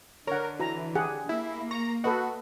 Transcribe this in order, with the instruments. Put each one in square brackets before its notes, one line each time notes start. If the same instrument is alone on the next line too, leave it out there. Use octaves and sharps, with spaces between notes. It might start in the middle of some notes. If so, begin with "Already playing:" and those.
[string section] D3 [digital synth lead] A#4 [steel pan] C#5 F#5
[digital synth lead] E3 [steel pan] F#4 A#5
[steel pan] G4 G#4 F#5
[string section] A#3 [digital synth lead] E4
[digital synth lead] A#5 [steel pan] C#6
[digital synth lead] F#4 [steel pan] A4 B4 D#5